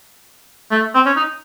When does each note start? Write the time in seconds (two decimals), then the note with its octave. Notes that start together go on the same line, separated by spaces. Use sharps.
0.71 A3
0.94 C4
1.06 C#4
1.17 D#4